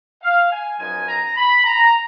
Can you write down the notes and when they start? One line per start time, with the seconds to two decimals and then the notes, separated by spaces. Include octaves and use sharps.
0.22 F5
0.51 G#5
0.79 F#2 F3 B3 D#4 G#5
1.08 A#5
1.37 B5
1.65 A#5